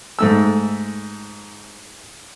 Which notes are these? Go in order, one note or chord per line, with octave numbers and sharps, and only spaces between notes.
G#2 A3 E6